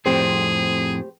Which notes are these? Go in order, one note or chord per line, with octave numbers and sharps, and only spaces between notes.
F2 A2 C4 G4 G#4 C5